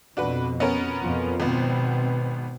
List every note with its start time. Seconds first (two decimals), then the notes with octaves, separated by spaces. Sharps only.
0.17 F2 B2 D4 F#4 B4
0.60 B3 C#4 A#4
1.01 F2 B2 F3
1.40 G#1 B2 B3 C4